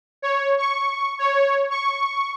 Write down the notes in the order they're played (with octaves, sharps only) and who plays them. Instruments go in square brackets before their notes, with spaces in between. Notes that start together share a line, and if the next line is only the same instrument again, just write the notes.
[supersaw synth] C#5
C#6
C#5
C#6